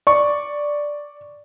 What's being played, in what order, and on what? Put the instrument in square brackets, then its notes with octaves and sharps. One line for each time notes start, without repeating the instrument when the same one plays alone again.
[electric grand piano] D5 C#6